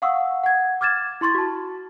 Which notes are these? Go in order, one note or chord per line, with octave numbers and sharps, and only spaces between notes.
F5 F#5 C#6 D#6 E6
F#5 G#6
D6 F6 G#6 A6 E7
E4 C6 C#6 A6
F#4 A5